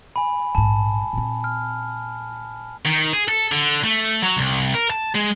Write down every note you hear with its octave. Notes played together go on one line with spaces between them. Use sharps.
G#5 B5
A#1 G#2 A5
A#2 C4
F6
D#3
G#4
A4
D3
A3
F#3
C2
A#4
A5
G#3